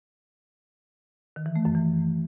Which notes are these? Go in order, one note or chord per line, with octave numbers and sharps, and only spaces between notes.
D#3
E3
A3
F#2
E3